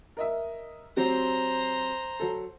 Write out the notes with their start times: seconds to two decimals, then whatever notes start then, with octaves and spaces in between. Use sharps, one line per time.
0.17 A#4 D#5 E5
0.97 F#3 C4 G4 C5 A#5
2.20 F#3 A4